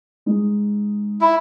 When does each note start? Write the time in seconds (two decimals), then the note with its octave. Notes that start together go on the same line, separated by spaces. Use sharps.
0.26 G#3 D#4
1.21 E4